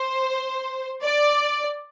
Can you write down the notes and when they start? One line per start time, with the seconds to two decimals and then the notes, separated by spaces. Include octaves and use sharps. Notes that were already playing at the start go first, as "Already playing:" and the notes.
Already playing: C5
1.02 D5